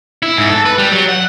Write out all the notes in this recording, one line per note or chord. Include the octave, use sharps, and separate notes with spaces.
E4
G#2
A4
B4
G3
F#3
F#5